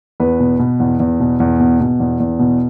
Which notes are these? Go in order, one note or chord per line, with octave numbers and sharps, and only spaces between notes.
E2 B4
B2
B2
E2
E2
B2
E2
B2
B2
E2
E2
B2